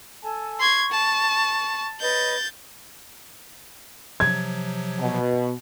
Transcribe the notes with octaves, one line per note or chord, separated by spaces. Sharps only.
A4 G#5 A5
C6 C#6 G#6
A5
B4 C#5 D#5 G6 A6
C3 F3 F#3 G#6
B2